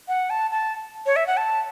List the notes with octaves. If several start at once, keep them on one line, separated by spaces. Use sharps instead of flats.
F#5
A5
A5
C#5
E5
F#5
A5